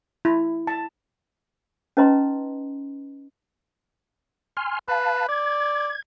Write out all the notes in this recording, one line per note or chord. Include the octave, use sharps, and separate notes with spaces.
E4
A5
C#4 D#4 B4 D#5 A#5 C6
G#5 C6 F6
B4 F5 A5
D5 G#6